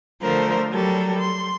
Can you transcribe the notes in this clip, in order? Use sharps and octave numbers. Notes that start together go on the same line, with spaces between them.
D3 F3 A3 A#4 C5
F#3 G3 A4 A#4
C6